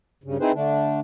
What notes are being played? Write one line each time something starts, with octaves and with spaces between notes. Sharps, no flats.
G2 C#3
C4 D#4 E4 G#4 B4 C5
D3 A3 D4